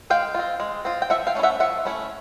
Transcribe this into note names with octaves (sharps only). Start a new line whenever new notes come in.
G#3 F5 G5
C4 F4
G#3
C4 F4
G5
F3 E5 F#5
F5 G5
A3 C#4 E4
E5 F#5
F3 E5 F#5
A3 C#4 E4